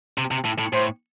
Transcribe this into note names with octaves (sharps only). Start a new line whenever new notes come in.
C3
C3
A2
A2
A2 C5